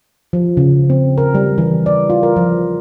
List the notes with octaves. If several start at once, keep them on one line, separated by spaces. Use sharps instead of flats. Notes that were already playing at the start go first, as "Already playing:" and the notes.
F3
C#3
C4
A#4
G3
E3
D5
F4
A#4
F3